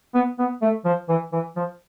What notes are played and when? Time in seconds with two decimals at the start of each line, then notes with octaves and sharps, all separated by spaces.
0.14 B3
0.39 B3
0.62 A3
0.85 F3
1.09 E3
1.33 E3
1.56 F3